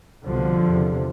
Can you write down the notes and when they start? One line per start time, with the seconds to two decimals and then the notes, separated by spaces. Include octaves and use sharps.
0.25 C2 B2 D3 F3
0.64 E2 C3